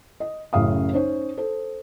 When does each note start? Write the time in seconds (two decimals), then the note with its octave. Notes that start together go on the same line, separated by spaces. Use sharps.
0.20 D#5
0.53 A1 F#2 C#3 F5 D#6
0.93 C#4 D#4 C5 C#5
1.38 A4 C5